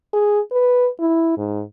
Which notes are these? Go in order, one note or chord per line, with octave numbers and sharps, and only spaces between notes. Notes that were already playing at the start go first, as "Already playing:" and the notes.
G#4
B4
E4
G#2